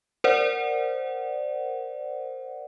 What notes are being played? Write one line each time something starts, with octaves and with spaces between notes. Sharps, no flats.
A#4 C5 D5 F#5